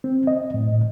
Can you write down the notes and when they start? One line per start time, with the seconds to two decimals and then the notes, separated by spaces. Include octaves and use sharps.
0.04 C4
0.27 D#5
0.54 A2